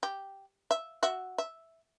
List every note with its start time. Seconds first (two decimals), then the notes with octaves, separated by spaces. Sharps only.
0.03 G4
0.71 E5
1.03 F#4 E5
1.38 E5